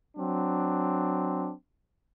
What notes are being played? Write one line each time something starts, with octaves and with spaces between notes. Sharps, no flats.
F#3 C4 D4